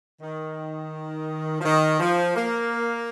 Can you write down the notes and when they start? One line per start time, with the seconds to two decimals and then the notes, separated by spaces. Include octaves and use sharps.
0.21 D#3
1.61 F3
1.65 D#3
2.00 F3
2.36 A#3